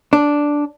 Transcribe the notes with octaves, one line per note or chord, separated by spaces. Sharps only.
D4